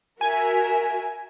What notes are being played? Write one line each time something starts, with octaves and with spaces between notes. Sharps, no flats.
F#4 A#4 E5 G#5